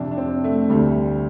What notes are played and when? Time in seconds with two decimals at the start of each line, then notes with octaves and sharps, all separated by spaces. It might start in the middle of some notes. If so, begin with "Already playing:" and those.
Already playing: F2 C3 D4
0.11 D4
0.17 C4
0.44 A3
0.69 D2 D3 G3